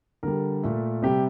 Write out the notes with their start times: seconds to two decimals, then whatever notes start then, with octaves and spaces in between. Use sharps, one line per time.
0.23 D3 G3 A#4
0.63 A#2 A3
1.02 C3 G3 G4